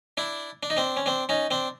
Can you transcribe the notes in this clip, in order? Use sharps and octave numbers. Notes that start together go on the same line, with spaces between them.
D4 E4
D4
D#4
C4 D4
C#4
C4 D4
C#4 D#4
C4 D4